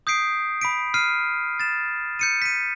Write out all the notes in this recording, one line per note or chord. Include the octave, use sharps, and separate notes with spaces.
D#6 G6 B6 C7 D7
B5 B6 D7
F6 C7 D#7
A6 E7
G6 C#7 D#7
B6 D#7